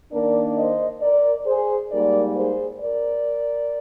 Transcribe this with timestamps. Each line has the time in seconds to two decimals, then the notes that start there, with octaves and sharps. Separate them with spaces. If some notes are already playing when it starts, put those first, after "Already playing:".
0.12 D#3 A#3 D4 A#4 D5
0.57 C5 D#5
1.02 A#4 D5
1.47 G#4 C5
1.92 G#2 G3 A#3 D#4 A#4 D5
2.37 G#4 C5
2.82 A#4 D5